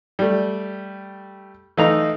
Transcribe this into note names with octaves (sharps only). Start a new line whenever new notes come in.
G3 A3
E3 A3 D#4 F5 A#5